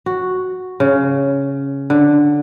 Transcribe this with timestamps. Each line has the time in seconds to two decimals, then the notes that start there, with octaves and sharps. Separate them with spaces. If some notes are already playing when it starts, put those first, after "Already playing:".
0.06 F#4
0.80 C#3
1.90 D3